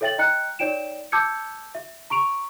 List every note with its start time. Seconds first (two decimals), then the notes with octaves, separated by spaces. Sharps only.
0.01 A4 C#5 E5 G5 A6 F#7
0.18 D#5 G5 A#5 F#6 C#7
0.59 D#4 C#5 D5 G5 D7 E7
1.12 A5 D6 E6 G6 G#6 C#7
1.75 E5
2.10 A#5 C#6 D7 F7